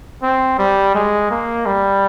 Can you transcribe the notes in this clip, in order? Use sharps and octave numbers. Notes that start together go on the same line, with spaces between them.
C4
G3
G#3
A#3
G3